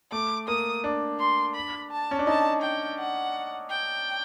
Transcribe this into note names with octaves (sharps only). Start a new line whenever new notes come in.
A3 D6
A#3 D#6
D4
C6
B5
A5
C#4
D4
D#4 A5
G5
F#5
G5